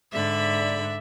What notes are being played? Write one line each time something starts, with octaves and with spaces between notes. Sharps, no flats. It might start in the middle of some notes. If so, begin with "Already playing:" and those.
G#2 D3 D5 E5 B5